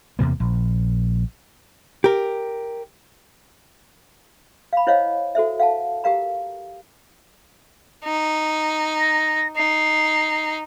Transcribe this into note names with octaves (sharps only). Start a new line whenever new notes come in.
E2 C3 A#3
A#1
G4 A#4
F5 B5
E4 C5 C#5 D#5 F5 F#5
F#4 A4 C5 E5
F5 F#5 A5
G4 A#4 F5 A#5
D#4
A#6
D#4 C7